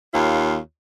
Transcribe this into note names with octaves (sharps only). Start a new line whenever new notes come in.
D#2 F4 C#5